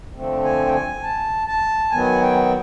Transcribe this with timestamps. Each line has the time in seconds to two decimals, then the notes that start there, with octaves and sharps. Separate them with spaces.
0.14 D3 F3 A3 C4
0.44 G#5
0.67 G5
0.73 G#5
1.03 A5
1.47 A5
1.91 D#3 F#3 B3 G#5
2.21 G5